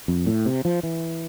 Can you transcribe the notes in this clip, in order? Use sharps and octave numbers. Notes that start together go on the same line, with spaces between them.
F2
A2
C3
F3
E3